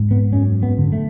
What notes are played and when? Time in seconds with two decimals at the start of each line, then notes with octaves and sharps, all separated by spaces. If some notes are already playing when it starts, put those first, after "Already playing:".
Already playing: G#2
0.11 B3
0.33 F#2 C#4
0.63 B3
0.78 D3
0.93 A3